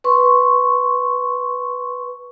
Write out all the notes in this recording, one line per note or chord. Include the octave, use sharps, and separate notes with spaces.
B4 C6 C#6